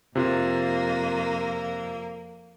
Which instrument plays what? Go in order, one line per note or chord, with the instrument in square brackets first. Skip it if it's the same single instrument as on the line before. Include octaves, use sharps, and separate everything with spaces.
[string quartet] F2 A#3 [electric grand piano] C3 F4